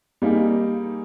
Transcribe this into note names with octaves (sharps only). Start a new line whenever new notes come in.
G3 A#3 D#4 G#4